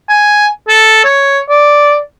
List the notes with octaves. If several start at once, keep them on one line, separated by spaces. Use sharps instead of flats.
G#5
A4
C#5
D5